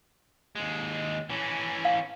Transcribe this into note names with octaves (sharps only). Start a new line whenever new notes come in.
D#2 G#3
E3 C#4
F5